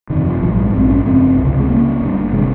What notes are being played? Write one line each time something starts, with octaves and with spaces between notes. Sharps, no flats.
G1 F2 C3 D#3
F3
A#1 G#2 F3
G3
G#3
A#1 G#2 C4
C#4
G1 F2 C#3 C4
C#2 C3
G#3
C#2 C#3 A#3
G1 G2
C3 G#3